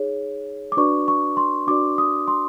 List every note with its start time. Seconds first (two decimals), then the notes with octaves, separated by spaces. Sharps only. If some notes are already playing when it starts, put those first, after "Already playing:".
Already playing: D#4 G#4 C#5
0.72 D6
0.77 D4 F#4 B4 D5 C#6
1.08 C#6
1.37 C6
1.67 D4 F#4 B4 D5 D6
1.98 D#6
2.28 C6